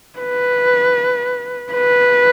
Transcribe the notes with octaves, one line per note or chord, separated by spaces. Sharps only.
B4
B4